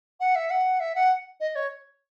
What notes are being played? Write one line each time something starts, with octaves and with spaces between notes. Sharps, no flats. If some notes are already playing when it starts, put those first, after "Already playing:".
F#5
E5
F#5
E5
F#5
D#5
C#5